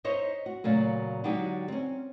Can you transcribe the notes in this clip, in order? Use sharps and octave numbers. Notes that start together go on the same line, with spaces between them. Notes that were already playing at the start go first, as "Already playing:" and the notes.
D#4 C5 C#5 D#5 E5
F#4
A#2 C#3 F#3 A3
D3 F#3 G#3 D#4 G4
C4 C#4